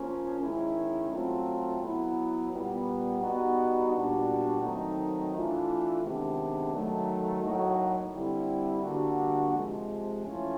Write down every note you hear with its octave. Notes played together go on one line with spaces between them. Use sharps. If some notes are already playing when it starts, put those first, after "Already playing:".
Already playing: F3 A#3 C#4
D#3 G#3 C#4 E4
F#3 A3 C4 F4
F#3 B3 E4
A#2 G3 B3
G3 B3 D#4 F#4
A#2 G3 B3 D4 F#4
D#3 F#3 A3 C4 D#4
E3 A3 D4 F4
C3 D#3 G#3 B3 D4
D#3 F#3 A3
A2 F#3 A#3 D#4 F#4
D3 G3 C4 E4
D3 G3 A#3 D4 F#4
C3 F3 G#3
E3 A3 C#4 F4